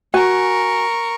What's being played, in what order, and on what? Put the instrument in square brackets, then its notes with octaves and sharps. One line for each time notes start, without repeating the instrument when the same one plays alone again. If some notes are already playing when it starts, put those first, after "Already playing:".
[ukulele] F#4 G#5 [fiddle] A#4 C#6